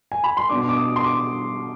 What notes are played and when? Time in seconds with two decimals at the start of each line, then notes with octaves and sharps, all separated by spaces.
0.12 G#5
0.24 B5
0.37 C6
0.50 B2 B3 D4 D6
0.69 D6
0.77 D#6
0.96 C6
1.04 D6